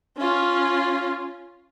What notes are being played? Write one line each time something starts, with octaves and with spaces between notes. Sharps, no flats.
C#4 F4